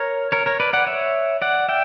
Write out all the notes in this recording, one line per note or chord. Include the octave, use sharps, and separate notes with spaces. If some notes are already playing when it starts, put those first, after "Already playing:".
Already playing: A#4 C#5
A#4 C#5
A#4 C#5
B4 D5
D5 F#5
C#5 E5
D5 F#5
E5 G5